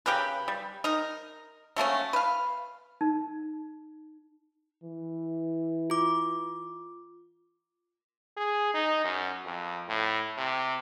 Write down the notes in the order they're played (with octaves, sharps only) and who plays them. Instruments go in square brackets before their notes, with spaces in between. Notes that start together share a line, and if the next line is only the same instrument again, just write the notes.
[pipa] C#3 G4 A#4 B4
G3
D#4 A#4
F#3 A3 A#3 C#4
B4 F5
[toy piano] D#4
[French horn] E3
[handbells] F4 D6
[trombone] G#4
D#4
F#2
F2
A2
C3